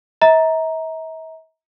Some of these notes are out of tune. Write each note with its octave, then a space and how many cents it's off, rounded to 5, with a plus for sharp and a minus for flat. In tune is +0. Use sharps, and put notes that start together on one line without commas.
E5 -45 A#5 +0